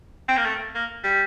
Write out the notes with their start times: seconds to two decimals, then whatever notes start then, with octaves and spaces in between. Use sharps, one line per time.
0.28 C4
0.37 A#3
0.45 A3
0.75 A#3
1.04 G3